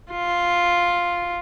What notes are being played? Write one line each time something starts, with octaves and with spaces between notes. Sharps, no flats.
F4